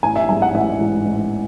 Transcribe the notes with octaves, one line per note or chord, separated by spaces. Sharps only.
A1 G#5
E5
G#2 E3 G#3 G#5
F#5
A1 E5
G#2 E3 G#3
A1